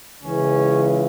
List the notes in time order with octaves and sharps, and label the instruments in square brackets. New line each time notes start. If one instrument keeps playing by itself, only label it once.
[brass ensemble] C#2 C#3 E3 C#4